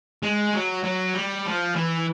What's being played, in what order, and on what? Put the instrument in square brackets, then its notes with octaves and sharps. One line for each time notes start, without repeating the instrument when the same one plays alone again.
[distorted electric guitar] G#3
F#3
F#3
G3
F3
E3